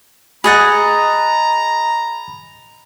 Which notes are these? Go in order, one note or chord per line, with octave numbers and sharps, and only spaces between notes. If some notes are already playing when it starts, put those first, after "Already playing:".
G#4 D#5 F#5 A#5 B5 G#6 A6